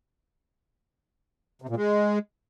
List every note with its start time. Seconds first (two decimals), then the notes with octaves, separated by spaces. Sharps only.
1.62 C3
1.69 A#2
1.76 G#3